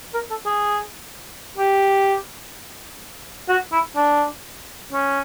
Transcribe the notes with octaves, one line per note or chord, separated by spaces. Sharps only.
A#4
A4
G#4
G4
F#4
E4
D4
C#4